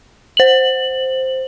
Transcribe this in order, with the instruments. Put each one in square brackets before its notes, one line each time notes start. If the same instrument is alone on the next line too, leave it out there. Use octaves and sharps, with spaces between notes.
[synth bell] C5 F#7